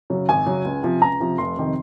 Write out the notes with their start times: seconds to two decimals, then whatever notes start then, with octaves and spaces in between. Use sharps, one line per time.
0.10 F#2 C#3 F#3
0.29 G#1 G#5
0.46 F#2 C#3 F#3
0.65 C#2
0.83 C3 F3
1.01 C#2 A#5
1.20 C3 F3
1.38 F1 C6
1.57 F2 C3 D#3